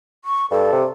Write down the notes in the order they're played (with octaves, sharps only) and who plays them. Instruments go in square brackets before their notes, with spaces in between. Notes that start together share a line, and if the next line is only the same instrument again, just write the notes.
[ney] C#6
[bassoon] G2 [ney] A4
[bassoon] C3